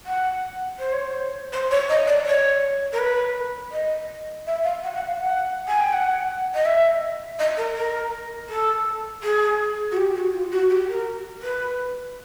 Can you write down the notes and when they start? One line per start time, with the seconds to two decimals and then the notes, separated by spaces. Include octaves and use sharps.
0.06 F#5
0.79 C5
0.92 C#5
1.05 C5
1.52 C5
1.71 C#5
1.89 D#5
2.07 D5
2.26 C#5
2.92 A#4
2.99 B4
3.72 D#5
4.46 E5
4.64 F5
4.83 F#5
4.94 F#5
5.07 F5
5.19 F#5
5.68 G#5
5.80 G5
5.93 F#5
6.54 D#5
6.65 E5
7.39 D#5
7.57 A#4
7.75 A#4
8.49 A4
9.23 G#4
9.91 F#4
9.97 G4
10.15 F#4
10.33 F4
10.52 F#4
10.69 G4
10.88 A#4
11.42 B4